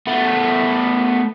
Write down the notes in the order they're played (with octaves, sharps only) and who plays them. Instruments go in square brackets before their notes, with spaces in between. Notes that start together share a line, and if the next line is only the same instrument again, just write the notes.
[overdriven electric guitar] A3 B3